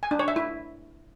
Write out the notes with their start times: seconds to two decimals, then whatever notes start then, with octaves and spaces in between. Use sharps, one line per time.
0.03 G#5
0.11 D4
0.19 C#5
0.28 E5
0.36 E4